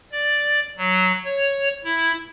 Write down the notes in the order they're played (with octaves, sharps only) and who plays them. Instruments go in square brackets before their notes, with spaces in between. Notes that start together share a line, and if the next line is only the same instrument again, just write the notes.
[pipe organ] D5
F#3
C#5
E4